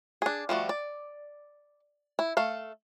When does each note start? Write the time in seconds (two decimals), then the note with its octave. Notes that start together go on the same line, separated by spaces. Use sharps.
0.22 D4 G#4
0.49 F3 G3 A3 F#4
0.69 D5
2.19 E4
2.37 A3 A4 F5